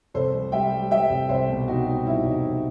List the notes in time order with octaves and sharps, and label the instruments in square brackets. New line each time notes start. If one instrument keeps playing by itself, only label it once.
[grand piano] C2 A4 C5
C2
G3 E5 G5
G3
G3 E5 G5
C2
C2 C5 E5
B2
C2 D#4 F#4
G3 D#4
C2 E4
C2 D#4 F#4
C2